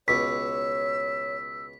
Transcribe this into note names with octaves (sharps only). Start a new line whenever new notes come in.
C#2 B2 C#5 E6 B6